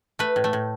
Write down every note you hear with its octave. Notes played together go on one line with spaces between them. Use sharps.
A3 B4
A2
A3
A2